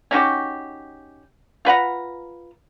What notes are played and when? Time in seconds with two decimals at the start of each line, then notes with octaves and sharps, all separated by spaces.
0.11 C#4 D#4 F#4 G4
1.65 F4 B4 F#5 A#5